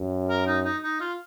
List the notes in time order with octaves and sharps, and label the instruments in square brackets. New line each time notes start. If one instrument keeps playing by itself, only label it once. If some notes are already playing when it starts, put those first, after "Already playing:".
Already playing: [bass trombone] F#2
[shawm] A#4
D#4
D#4
D#4
F4